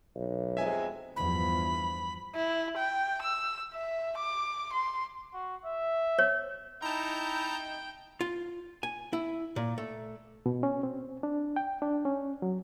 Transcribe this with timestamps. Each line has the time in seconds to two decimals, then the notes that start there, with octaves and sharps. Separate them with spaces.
0.15 B1
0.57 F2 C3 G#3 E5 G#5
1.16 E2 G2 F3 B5
2.36 E4
2.78 G5
3.22 E6
3.74 E5
4.17 D6
4.73 C6
5.34 F#4
5.65 E5
6.19 C#5
6.82 D#4 E4 G5 A5 A#5
8.21 F4
8.83 G#5
9.13 E4
9.56 A#2
9.78 A3
10.46 B2
10.63 C#4
10.83 C4
11.23 D4
11.56 G5
11.82 D4
12.05 C#4
12.42 F#3